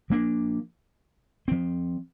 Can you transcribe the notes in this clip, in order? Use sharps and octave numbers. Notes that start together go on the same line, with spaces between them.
F3 A#3 D4
F3 C4